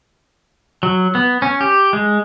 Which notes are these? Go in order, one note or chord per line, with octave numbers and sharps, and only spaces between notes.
F#3
B3
C#4
G4
G#3